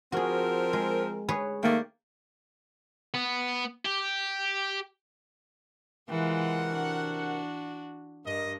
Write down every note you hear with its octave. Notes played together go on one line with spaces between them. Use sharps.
F3 C4 F#4 G#4 A#4
G#3
G#4 B4 C#5
D#3 A3 A#3 D5 G5
B3
G4
C3 E3 G#3 F4 A#4 F#5
D4 F#4
G2 A#4 D#5